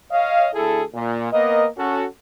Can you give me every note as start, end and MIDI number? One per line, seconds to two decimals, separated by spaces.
0.11 0.46 73
0.11 0.46 75
0.11 0.46 77
0.54 0.82 38
0.54 0.82 64
0.54 0.82 68
0.54 0.82 69
0.95 1.30 46
1.32 1.66 58
1.32 1.66 59
1.32 1.66 70
1.32 1.66 75
1.78 2.05 61
1.78 2.05 66
1.78 2.05 69